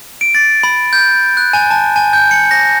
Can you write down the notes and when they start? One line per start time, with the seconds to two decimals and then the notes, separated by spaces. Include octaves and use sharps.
0.21 D7
0.35 A6
0.63 B5
0.93 G6
1.37 F#6
1.53 G#5
1.71 A5
1.96 G#5
2.13 G6
2.31 C#7
2.51 A#6